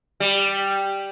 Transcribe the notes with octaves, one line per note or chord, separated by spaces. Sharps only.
G3